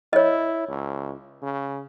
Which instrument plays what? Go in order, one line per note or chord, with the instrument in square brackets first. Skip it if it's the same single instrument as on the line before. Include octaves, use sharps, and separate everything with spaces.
[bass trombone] E4 [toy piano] C#5 D#5
[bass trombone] C#2
C#3